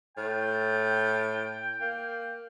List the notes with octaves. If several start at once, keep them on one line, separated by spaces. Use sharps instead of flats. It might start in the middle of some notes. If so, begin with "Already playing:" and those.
A2 G5
A#3